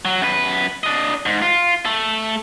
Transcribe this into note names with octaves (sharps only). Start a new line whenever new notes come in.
F#3
F#2 B4
D4 D#5
G#2
F4
A3 A4